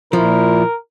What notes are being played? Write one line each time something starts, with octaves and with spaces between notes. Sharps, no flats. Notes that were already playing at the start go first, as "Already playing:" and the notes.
A#2 F3 E4 A#4